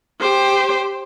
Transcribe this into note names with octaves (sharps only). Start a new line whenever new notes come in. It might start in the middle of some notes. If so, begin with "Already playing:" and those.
G4 C5